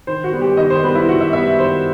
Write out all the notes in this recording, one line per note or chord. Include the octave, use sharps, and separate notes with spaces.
D#3 C5
F#4
G3 B3
G4
D#3 D#5
C5
G3 B3 B4
E4
D#3 F#4
E5
G3 B3 E5
D#3 C5